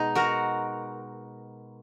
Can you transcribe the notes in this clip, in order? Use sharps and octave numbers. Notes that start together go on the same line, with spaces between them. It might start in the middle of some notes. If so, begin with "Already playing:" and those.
Already playing: B2 G#3 D#4
F#4 A#4